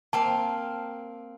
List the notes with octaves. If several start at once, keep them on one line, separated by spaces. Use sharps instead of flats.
A#3 C4 F5 A5